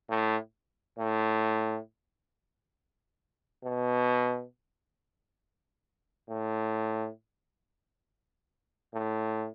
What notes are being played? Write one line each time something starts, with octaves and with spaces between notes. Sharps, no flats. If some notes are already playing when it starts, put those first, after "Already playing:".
A2
A2
B2
A2
A2